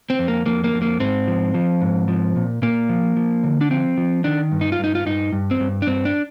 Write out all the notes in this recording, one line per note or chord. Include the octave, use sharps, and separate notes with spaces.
C4
F2
A#3
F2 A#3
A#3
F2
A#3
G#2 C4
F3
F3
G#2
F3
A#2
A#2 A#3
F3
F3
D3
D4
F3 C4
F3
D#3 D4
G2
D#4
F4
G2 D#4
F4
G2 D#4
G2
C4
G2
D4
G2 C4
D4